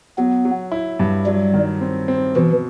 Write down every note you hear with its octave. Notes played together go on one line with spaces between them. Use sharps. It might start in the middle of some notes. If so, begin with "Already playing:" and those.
F#3 B3
F#3
E4
G2
F#3 G3
D#3
C4
C4
B2 E3